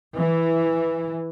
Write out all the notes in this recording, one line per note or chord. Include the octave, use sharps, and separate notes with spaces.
E3